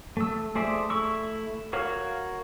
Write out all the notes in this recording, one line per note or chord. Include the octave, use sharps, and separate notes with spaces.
A3 E6
A3 G#4 C5 D5 E5
A3 E4 C#6 E6
F#4 A#4 C#5 F5 F6